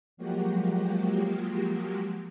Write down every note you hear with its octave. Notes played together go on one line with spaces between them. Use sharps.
F3 F#3 G#3 A#3 F#4 G4